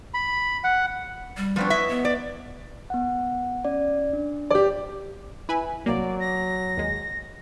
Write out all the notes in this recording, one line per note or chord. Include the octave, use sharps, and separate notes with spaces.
B5
F#5
G3
F3 B3 C4 D4 B4 C#5
E4 D#5 E5
B3
D5
B3 F#5
C#4 D5
D4
G4 B4 D5 D6 G6
E4 B4 G#5
C2 F#3 A#3 D5
A#6
D#2 G#3